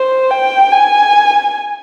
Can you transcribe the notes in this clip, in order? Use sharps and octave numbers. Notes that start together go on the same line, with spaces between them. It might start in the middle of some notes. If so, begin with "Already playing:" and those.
Already playing: C5
G5
G#5